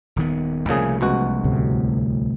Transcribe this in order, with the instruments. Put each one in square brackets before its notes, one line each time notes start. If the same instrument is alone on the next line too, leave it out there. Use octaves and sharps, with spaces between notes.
[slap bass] D#1 D#3 B3
[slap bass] C2 F3 A3 [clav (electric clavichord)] A#2 C#3 G#4
[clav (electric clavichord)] C#2 B2 F#4
[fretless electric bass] D2 A2 C3